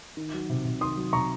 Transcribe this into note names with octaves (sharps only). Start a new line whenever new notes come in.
D#3
F#3
C3
C3
D#3 C6 D#6
F#3
C3 A#5 C#6